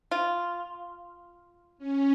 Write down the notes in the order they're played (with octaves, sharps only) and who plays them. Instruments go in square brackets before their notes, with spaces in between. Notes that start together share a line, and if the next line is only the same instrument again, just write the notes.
[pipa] F4
[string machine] C#4